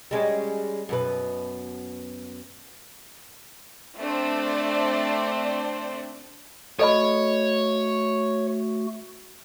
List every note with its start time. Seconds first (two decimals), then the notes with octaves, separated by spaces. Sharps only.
0.11 G3 G#3 C#4
0.89 F#2 B2 B4
3.99 A3 C4 D4 C5 D5
6.79 A3 F#4 A4 C#5 D#5 B5